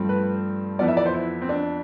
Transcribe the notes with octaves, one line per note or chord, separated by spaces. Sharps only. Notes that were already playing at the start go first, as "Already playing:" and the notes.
Already playing: G2 F3 A3 C4
B4
F2 E3 B3 D5
E5
D5
C5
E4
C4
D4